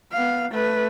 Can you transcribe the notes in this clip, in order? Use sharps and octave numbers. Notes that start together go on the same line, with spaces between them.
B3 F5
A3 B4